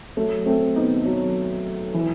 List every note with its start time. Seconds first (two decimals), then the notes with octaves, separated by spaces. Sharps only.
0.17 F#3 A3
0.46 A3 C4
0.76 B3 D#4
1.05 F#3
1.94 E3